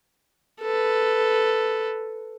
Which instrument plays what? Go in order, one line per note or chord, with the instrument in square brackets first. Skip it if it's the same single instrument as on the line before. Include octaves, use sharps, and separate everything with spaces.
[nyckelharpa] A4 B4